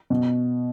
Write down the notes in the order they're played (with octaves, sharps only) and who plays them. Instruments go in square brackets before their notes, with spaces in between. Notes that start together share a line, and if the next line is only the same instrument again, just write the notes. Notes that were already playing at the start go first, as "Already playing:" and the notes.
[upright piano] B2